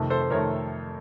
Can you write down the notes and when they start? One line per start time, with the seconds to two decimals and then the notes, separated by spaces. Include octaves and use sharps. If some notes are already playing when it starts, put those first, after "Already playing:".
Already playing: F2 C3 D#3 A3
0.10 A4 C5
0.21 C5
0.30 F2 C3 D#3 A3 A#4 C#5